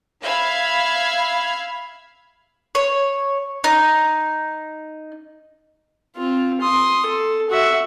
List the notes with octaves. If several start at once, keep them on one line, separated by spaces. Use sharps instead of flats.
E5 F5 B5 G#6
C#5
D#4
C4 F4
C6 D#6
A4
F#4 E5